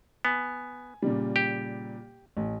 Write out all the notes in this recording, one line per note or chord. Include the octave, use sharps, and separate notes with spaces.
B3 G#5
A#2 C#3 G3
G4
A1